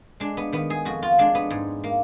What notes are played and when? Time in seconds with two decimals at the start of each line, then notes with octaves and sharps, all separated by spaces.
0.20 G#3 D4
0.37 B3
0.52 D#3 B3
0.70 G#4
0.85 F2 F#4
1.03 F4
1.18 G#3 D4
1.35 B3
1.51 G#2
1.84 A#3